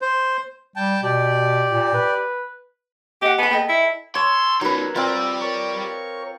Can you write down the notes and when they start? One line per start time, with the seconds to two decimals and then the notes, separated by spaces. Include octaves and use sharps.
0.02 C5
0.76 G3 G5 A5
1.03 B2 G4 D5
1.70 A#2
1.94 B4
3.22 G4 D#5 F#5
3.38 B3 G#5 B5
3.51 A4 D#5 G5
3.69 E4
4.15 C#5 A5 C6 E6
4.61 F#3 C#4 D#4 A#4 B4
4.96 G3 C4 F4 D5
5.41 A#4 C#5 C#6